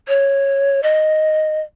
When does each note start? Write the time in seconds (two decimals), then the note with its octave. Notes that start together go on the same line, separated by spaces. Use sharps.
0.08 C#5
0.83 D#5